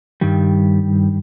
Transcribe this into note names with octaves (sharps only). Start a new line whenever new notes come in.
G2 D#3 G3